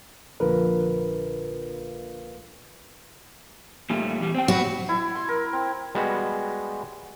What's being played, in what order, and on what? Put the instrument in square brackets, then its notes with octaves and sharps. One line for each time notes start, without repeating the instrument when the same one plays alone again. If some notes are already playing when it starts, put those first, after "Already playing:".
[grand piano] A#1 D3 F3 [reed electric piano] A#4 B4
[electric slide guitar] A#2 G3 A3
E2 G3
C4 G5
[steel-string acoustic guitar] F#4 B4
[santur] E4
C6
A#4
C4
[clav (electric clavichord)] G3 G#3 B3 F#4